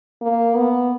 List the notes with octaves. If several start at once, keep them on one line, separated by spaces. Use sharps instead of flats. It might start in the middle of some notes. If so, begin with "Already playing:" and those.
A#3
B3